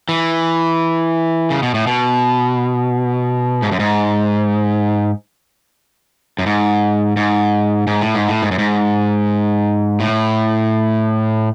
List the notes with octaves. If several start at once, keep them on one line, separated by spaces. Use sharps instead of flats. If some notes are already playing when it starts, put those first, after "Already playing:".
E3
C#3
B2
A2
B2
G#2
F#2
G#2
F#2
G#2
G#2
G#2
A2
G#2
A2
G#2
F#2
G#2
A2